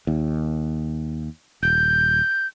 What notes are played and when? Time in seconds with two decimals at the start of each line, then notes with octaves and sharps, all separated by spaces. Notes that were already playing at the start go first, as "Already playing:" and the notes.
0.07 D#2
1.63 D#1 G6